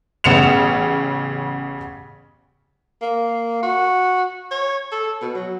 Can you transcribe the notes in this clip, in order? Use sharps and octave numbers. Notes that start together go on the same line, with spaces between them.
A1 C#3 B3 C#7 E7 F7
A#3
F#4
C#5
A4
B2
F#3